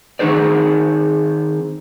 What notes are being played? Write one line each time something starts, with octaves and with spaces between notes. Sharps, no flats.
D#3 C4 D#4 G#4 C5 D5